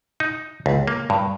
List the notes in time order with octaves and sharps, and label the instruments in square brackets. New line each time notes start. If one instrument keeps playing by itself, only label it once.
[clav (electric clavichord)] D#4
C#2
A#3
G2